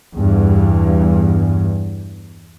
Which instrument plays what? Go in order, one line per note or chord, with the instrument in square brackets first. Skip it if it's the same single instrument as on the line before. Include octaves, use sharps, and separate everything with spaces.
[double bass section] E2 G2